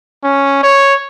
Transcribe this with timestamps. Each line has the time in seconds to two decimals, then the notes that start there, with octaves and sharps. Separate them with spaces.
0.24 C#4
0.63 C#5